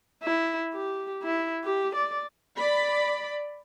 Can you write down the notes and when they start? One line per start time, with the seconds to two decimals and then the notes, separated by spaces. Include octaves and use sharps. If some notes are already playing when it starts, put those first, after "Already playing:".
0.23 E4
0.74 G4
1.23 E4
1.64 G4
1.95 D5
2.56 D5 B5